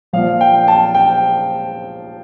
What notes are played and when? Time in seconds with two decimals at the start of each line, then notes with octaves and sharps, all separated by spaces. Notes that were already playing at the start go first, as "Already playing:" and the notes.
0.13 A#2 F3 F5
0.41 G5
0.68 A5
0.94 G5